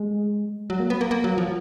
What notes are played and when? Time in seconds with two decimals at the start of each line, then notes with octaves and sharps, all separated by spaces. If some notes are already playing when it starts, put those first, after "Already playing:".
Already playing: G#3
0.70 F#3
0.80 A#3
0.90 B3
1.01 A#3
1.11 A#3
1.24 F#3
1.38 F3